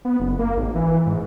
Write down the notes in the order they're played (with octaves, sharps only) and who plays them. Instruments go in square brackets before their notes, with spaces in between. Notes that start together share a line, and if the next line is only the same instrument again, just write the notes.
[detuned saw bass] B3
F#1
A#3
G#1
E3
G#2